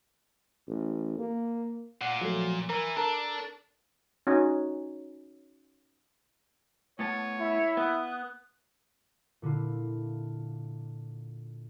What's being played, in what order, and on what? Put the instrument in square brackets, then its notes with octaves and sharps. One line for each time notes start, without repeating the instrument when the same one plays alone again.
[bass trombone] A1
A#3
[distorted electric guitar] A#2 [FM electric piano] F#5 C7
[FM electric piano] F3 F#3 A3
[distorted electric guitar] E3 [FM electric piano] A#4
[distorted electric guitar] D4 [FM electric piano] A4 A#4
[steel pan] C#4 D#4 F#4 G#5
[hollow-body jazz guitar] A2 B3 A5 [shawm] C#5
[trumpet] E4 [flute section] E5
[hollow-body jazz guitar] B3 [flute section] D#6 F#6
[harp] A#2 D3 E4 F4